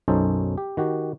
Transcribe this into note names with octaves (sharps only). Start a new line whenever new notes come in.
B1 F#2 C#4 D#4 A4 C5
G4
D#3 F#4 G4